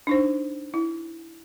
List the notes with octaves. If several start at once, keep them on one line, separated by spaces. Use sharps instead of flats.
D4 D#4 C5
E4